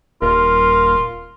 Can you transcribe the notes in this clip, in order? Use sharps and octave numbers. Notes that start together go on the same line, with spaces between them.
D#1 F4 A#4